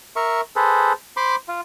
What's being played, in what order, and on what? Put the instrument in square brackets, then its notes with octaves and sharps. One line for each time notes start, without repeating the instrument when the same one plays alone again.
[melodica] A#4 E5 C#6
G#4 A4 B4 C5
C5 B5 C6 D6
F4